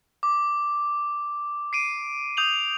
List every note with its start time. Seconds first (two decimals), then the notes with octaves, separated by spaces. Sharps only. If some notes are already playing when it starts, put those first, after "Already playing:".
0.23 D6
1.73 C7 D7 D#7
2.37 D#6 G6 F7 F#7